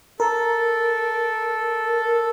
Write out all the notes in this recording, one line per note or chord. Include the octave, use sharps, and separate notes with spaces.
A4 A#4